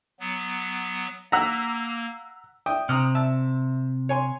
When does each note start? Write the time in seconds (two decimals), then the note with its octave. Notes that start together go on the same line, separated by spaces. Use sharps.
0.20 F#3 B3
1.32 A#3 F#5 A#5 E6 B6
2.66 E5 G5 D#6
2.89 C3 A#5 D#6 F6
3.15 E5 A5 E6
4.09 C#5 G#5 C6